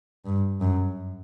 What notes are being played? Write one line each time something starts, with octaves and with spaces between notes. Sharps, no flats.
G2
F#2